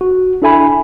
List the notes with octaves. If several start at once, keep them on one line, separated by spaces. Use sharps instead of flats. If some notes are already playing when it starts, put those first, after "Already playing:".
F#4
D4 E4 A4 E5 G#5 B5